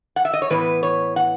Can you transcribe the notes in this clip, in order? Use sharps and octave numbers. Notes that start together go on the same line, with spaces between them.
F#5
E5
D#5
C#5
A2 E3 B3 B4
C#5
F#5